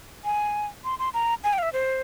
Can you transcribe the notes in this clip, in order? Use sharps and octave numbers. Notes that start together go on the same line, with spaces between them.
G#5
C6
C6
A#5
G#5
G5
F5
E5
C5